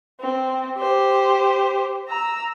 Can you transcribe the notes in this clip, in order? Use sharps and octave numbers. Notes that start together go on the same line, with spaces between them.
C4
G4 C5
A#5 E6